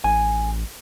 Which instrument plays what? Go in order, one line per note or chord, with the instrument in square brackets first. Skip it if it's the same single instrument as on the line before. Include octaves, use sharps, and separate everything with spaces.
[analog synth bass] A1 [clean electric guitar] G#5